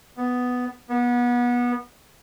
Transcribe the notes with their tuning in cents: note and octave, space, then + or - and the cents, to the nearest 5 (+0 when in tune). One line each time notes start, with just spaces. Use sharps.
B3 +5
B3 -25